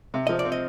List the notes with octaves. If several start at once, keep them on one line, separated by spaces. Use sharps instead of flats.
C3
F3 D#5
D5
C4
D#5